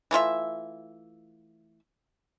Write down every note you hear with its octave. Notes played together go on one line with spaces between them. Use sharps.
E3 A3 F4 E5